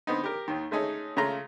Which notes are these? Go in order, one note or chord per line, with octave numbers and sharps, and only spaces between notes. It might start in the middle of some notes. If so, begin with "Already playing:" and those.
D3 B3 C4 D#4
G4 A#4
D#2 D#3
G#3 A3 C#4 D#4 G#4 A4
C#3 G#3 A3 F4 A#5 C6